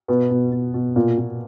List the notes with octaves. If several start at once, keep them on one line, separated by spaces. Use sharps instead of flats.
B2 B3
B2
B2
B2
A#2
A#2